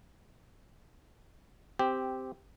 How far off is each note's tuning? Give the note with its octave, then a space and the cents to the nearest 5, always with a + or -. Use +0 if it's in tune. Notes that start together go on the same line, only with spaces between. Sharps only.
C4 -10 G4 +0